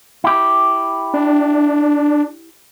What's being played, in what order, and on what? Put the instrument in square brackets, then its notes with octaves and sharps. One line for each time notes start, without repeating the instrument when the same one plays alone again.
[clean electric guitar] E4 G4
[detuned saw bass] D4